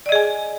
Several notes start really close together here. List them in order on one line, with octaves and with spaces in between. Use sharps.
D5 D#5 G#4 G#5